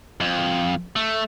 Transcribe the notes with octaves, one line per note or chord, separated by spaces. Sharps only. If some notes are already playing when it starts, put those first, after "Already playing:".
F2
A3